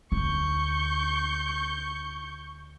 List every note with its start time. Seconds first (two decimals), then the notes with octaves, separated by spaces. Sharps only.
0.12 D2 C#6 G6